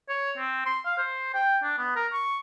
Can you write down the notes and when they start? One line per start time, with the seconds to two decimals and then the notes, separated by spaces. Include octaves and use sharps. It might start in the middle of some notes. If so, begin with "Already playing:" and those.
0.09 C#5
0.37 C4
0.66 C6
0.85 F5
0.98 C5
1.34 G5
1.63 D4
1.78 B3
1.96 A#4
2.13 C#6